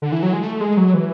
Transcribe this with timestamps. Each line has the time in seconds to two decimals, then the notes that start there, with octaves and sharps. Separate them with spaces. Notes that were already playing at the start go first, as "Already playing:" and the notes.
0.02 D3
0.12 E3
0.23 F#3
0.33 G#3
0.43 A3
0.61 G#3
0.77 F#3
0.94 E3